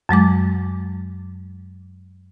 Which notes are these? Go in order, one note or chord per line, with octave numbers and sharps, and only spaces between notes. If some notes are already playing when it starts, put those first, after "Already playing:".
F#2 F#3 G#3 D6